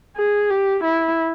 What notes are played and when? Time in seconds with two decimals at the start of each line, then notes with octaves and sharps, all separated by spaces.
0.17 G#4
0.50 G4
0.84 E4